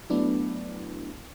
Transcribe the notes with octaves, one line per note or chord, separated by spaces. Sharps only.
F#3 A3 B3 D4 E4